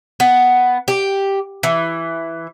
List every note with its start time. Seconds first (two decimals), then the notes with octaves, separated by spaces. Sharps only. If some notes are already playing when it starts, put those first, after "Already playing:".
0.20 B3
0.88 G4
1.63 E3